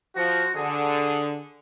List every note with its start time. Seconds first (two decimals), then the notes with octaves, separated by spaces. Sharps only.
0.16 F3 F#4
0.55 D3 G#4